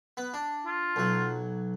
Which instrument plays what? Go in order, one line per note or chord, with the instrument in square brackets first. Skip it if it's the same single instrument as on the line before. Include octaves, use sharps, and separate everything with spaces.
[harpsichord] B3
D4
[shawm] F4
[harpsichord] B1 F#3